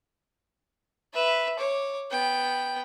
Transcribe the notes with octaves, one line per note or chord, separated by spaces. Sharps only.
B4 E5
C#5 D6
B3 G5